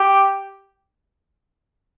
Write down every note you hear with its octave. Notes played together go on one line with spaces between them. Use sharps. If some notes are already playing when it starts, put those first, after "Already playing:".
Already playing: G4